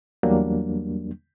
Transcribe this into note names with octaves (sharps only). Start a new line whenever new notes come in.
E2 F#3 G3 A#3 D4